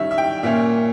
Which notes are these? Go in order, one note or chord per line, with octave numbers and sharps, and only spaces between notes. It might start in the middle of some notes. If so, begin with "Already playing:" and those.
Already playing: D#3 G3 C#4 E5
E5
G5
A#2 A#3 C#4 E5